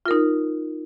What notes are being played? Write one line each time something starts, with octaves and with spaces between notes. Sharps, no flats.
D#4 F4 A#4